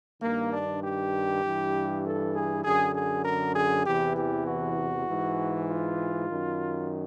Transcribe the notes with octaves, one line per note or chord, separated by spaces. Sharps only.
G2 D#3 A#3
D4
G4
G2 E3
A4
G#4
F#2 D3 G#4
G#4
A#4
G#4
E2 C3 E3 G4
G4
F#4
G#2 E3
F4
F#2 D#3